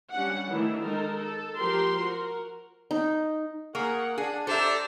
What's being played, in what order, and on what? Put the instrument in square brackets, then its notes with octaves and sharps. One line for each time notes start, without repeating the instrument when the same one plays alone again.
[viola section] G3 C#4 D4 F#5
D#3 E3 A3 D4 E4
G#3 D#4 A4 A#4
A4
F3 G4 A#4 C5 C6
F#4 A#4
[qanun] D#4
[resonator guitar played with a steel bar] A#3 [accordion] G#4 A#4 C#6 [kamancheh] F#5
[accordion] D4 [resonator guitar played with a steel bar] G#4
[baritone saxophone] D4 [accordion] G4 C5 [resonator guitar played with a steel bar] A4 E5 [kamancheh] D5 A#5